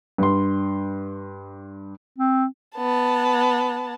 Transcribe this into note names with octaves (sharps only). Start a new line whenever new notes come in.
G2 C6
C4
B3 A5